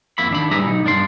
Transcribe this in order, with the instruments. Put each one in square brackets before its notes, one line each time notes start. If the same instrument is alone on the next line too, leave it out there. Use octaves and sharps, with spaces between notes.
[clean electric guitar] F2 A#3 E5 B5
D#3 D4 B5
A2 G3 G#4 B4 E5 A#5
B1 D#4
G2 D4 A#4 C6